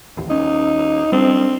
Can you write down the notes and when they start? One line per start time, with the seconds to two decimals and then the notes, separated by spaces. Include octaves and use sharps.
0.17 A1 D#2
0.30 D#2 C#4 D#4
1.12 G3 C4 D4